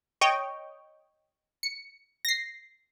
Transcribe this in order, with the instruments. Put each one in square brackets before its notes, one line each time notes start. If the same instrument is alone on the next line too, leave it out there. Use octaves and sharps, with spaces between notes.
[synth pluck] C#5 D#5 G5
C#7
A#6 C7